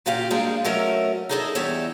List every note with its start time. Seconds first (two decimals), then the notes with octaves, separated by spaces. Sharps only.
0.06 A#2 C#3 F#4 G4 F5
0.30 G3 G#3 A#3 C4 D4 G#4
0.65 F#3 A3 C#4 A#4 D#5 E5
1.29 D#4 E4 G#4 A4 C5 D#5
1.55 E2 G3 C#5 E5